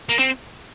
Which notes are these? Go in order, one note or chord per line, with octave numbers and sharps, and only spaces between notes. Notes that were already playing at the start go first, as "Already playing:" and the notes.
A#3
C4